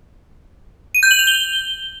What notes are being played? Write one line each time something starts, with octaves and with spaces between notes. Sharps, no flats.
D#7
G6
F#7
F7
G7